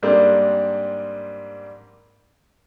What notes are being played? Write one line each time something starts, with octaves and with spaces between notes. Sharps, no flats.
G#2 G3 A#3 C4 D4